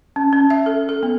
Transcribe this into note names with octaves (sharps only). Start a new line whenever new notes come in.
C#4
C#4
E5
A4
A4
B3